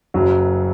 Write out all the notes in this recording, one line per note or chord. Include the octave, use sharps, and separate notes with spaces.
F#1 F#2 F#3